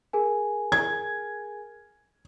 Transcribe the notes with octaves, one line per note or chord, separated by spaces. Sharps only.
G#4 A#4 G#5
G#6